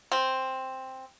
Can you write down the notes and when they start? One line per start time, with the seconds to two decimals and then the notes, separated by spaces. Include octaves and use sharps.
0.12 C4